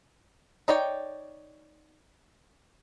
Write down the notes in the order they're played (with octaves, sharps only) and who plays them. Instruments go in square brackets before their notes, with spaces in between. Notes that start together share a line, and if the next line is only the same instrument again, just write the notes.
[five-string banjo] D#4 C#5 D5 G5